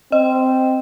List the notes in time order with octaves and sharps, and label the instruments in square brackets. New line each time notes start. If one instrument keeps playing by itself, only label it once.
[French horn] C4 [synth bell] D#5